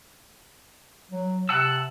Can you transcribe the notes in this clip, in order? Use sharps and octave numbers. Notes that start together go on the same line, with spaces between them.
F#3
C3 F#5 A5 E6